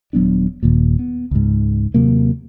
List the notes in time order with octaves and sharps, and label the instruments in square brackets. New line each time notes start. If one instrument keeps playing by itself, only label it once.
[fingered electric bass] D#1 F#3 B3 D4
D#1 D#2 A#2
B3
C#2 G#2
D#2 C3 F#3 A#3